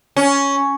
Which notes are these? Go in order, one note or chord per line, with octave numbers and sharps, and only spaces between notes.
C#4